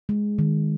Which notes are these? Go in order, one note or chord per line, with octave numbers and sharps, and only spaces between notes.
G#3
D#3